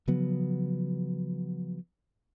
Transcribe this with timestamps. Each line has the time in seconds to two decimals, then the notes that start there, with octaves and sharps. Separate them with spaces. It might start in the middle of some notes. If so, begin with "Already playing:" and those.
0.08 C#3 F3 F#3 B3